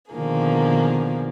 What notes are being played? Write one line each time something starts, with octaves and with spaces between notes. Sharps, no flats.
B2 D3 D#3 F3 A#3 G#4